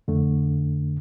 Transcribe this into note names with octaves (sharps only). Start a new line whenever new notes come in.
F2 D3 A3